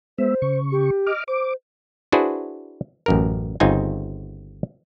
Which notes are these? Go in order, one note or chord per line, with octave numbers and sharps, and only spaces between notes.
G#3 B3 C5 E5
C#3 C#6
G4
D#5 D6 F6
C5 D6
D4 E4 F#4 G#4 B4 C5
A1 F#2 A#4
G1 C#3 C4 D#4 F4 G#5